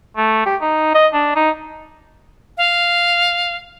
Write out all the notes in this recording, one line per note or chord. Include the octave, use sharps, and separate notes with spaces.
A3
G4
D#4
D#5
D4
D#4
F5